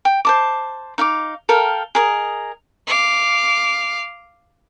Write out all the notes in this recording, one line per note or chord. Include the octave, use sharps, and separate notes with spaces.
G5
C5 A5 D6
D#4 F5 G5 D6
A4 A#4 F5 G5
G#4 A#4 D#5
F5 D6